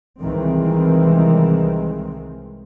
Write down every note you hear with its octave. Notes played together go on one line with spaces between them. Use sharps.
C2 D#3 E3 G#3 C4